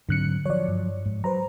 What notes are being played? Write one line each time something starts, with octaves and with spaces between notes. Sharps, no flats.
G#2 D3 F#3 C4 F#6 C#7
F3 F#3 C#5 D5
G2
G#2
F#3 B4 C5 A#5